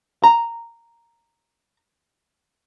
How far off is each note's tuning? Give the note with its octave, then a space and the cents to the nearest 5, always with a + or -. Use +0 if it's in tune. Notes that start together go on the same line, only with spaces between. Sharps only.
A#5 -5